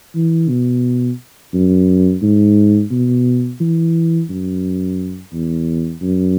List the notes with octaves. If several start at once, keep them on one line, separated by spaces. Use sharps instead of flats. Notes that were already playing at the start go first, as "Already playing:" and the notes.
E3
B2
F#2
G#2
B2
E3
F#2
E2
F#2